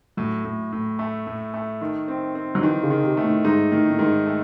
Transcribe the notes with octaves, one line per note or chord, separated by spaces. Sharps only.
A2 F#3
A2
A2
A3
A2
A3
D#3
C4
C4
F#3
D#3 E3
C#3
D#3
C3
A3
A2
G#2 D#4
A2 D#3
A2
G#2 D#3
A3